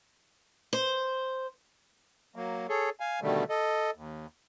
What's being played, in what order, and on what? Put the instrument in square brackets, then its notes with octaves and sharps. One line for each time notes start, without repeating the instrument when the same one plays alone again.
[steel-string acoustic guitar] C5
[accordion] F#3 A#3
G#4 A4 C#5
F5 G#5
B2 D3 D#3 G3 A3
A4 D#5
D#2